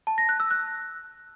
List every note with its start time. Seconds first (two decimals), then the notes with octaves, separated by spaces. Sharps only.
0.07 A5
0.18 A#6
0.29 F#6
0.40 E6
0.51 F#6